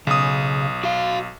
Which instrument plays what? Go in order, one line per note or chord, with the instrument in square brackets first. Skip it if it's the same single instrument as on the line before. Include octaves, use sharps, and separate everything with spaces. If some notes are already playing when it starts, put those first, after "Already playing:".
[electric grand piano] B1 D#6 [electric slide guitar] C#3
[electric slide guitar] F#4 F5